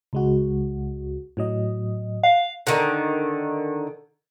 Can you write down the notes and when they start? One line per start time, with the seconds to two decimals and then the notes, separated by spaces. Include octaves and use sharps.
0.13 C#2 G#3 F#4
1.37 A2 F#3 D#5
2.23 F5 F#5
2.67 D3 D#3